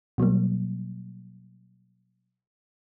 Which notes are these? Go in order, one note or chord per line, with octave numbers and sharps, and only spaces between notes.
B2 F#3 G3 A#3